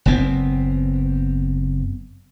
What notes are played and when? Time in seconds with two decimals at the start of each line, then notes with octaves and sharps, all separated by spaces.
0.06 F#1 B3 C4